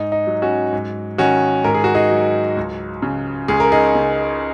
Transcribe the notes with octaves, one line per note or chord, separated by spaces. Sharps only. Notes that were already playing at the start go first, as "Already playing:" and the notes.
Already playing: G#2 D#4
D#4
F#3
C#4 F#4
G#2
D#3 C#4 F#4
G#2 A#4
G#4
F#4
D#4 G#4
F#3
C#2
C#3
C#2 G#4
A#4
D#4 G#4
C#3